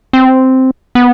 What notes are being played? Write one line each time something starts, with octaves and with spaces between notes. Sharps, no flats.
C4
B3